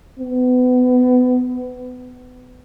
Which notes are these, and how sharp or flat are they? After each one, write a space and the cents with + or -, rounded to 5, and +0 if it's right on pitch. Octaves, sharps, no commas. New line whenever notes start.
B3 +25